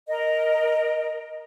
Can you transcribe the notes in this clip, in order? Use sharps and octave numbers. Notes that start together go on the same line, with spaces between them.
A#4 D#5